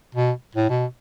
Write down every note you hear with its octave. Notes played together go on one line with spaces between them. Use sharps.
B2
A2
B2